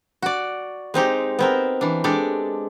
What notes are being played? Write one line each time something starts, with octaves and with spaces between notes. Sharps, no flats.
F#4 D5
G#3 C4 D#4 G4
B3 C4 A#4
E3 D4
G#3 D4 G4 A4